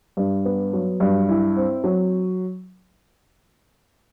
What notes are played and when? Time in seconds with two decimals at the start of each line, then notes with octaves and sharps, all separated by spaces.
0.17 G2
0.45 B3
0.73 F#3
1.00 G2
1.29 E4
1.56 C4
1.84 F#3